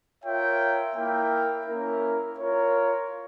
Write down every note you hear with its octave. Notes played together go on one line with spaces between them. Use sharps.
F4 A#4 C#5 E5 G5
A#3 E4 A#4 E5 G5
A#3 C#4 E4 A#4
F4 A#4 C#5